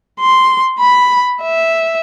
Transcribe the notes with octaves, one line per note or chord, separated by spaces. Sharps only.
C6
B5
E5